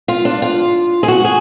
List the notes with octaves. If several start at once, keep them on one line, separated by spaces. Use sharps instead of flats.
F4
D4
F4
G#4
F#4
G#4